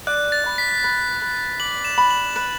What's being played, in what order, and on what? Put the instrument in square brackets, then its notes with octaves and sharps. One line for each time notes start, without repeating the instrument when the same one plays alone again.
[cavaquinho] D5 [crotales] F#6
[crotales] A6
[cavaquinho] B5
[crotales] B6
[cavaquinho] B4
B4
[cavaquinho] D5 [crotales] F#7
[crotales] E7
[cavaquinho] B5
[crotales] F#7
[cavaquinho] B4